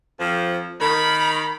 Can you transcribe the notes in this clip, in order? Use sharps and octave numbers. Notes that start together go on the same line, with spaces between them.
F2 F3
D#3 A#4 B5